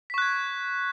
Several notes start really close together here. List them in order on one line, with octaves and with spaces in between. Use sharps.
B6 C#6 F#6 G#6